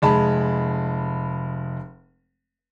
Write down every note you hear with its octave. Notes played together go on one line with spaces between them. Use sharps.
F1 G#3 A5 B5